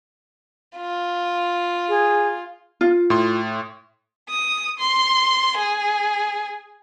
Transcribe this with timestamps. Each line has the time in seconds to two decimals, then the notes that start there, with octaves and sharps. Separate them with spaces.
0.77 F4
1.89 G#4
2.81 F4
3.10 A2 C6
4.29 D#6
4.79 C6
5.57 G#4